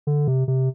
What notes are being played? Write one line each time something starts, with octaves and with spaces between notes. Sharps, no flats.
D3
C3
C3